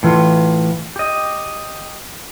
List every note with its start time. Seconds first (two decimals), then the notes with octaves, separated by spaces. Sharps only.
0.03 A2 E3 F4
0.96 G4 D#5